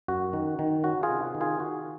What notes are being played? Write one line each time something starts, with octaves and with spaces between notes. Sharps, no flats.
F#2 F#4
D#3
D#3
C#4 F#4
F4 G#4
C3
D#3
F4 G#4
D#3 F#4